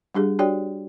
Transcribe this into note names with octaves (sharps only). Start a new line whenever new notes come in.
G3 D4 G4 G#4
D4 F#4 G4 C#5 D5 G5